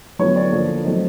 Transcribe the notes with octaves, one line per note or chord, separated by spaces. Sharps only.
D3 F#3 B3 E4 C#5
D5
D3 F3 A#3
F#3 A3 C4 D#4